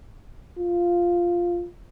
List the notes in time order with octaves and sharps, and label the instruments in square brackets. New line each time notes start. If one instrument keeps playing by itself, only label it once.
[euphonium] F4